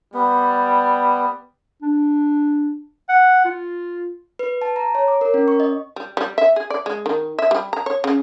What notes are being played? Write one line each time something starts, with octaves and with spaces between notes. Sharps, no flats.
G3 B3
D4
F#5
F4
B4
A5
A#5
C#5
D6
A#4
C#4
C#6
D#5
G3
G3
E5
G#4
D5
G#3
D#3
E5
G3
A#5
C#5
C#3